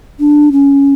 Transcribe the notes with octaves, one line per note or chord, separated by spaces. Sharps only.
D4
C#4